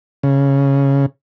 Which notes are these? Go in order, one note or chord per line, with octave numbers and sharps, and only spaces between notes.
C#3